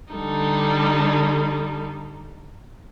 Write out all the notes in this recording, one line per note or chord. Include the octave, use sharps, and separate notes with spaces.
D3 G3 D#4 A4